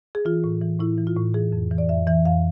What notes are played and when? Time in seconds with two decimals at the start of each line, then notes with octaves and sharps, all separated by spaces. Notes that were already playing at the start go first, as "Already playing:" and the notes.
0.15 G#4
0.25 E3 F4
0.44 A2
0.62 E3
0.79 A2 E4
0.98 E3
1.07 F4
1.16 A2
1.34 E3 G#4
1.52 F2
1.71 E3
1.78 D5
1.89 F2 E5
2.07 E3 E5
2.25 F2 F5